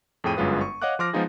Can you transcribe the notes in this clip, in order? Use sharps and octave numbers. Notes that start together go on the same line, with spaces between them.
F2 A2 G#4 G5 D#7
G1 F#2 G#3 F4 B4 D#6
C#6
C#5 D#5 F5 F#5 D6 F#6
F3 C6 D6 F6 A#6
F3 G#3 B3 D#4 F4 G#4